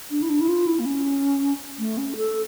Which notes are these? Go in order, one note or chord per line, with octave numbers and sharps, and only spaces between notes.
D4
E4
D4
E4
F4
E4
A#3
C#4
A3
C#4
A4